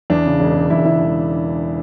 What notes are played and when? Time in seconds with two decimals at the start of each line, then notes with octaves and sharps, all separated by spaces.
0.10 E2 D4
0.26 C#3
0.40 E1
0.56 E1
0.70 E2 E4
0.85 C#3 E4
1.01 E1